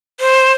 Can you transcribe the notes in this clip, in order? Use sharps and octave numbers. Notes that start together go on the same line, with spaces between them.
C5